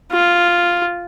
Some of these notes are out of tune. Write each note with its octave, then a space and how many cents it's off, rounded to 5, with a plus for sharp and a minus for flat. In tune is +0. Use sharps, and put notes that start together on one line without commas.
F4 +0